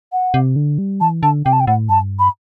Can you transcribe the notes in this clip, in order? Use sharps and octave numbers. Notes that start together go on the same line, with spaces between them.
F#5
C3
D3
G3
E3 A5
D3 A5
C3 G5
A5
G5
A2 F#5
G2 A5
B5